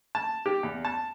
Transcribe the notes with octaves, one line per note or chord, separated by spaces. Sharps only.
A5
G4
E2
A5